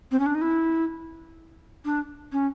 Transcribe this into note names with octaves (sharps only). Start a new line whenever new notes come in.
C4
C#4
D4
D#4
E4
D4
C#4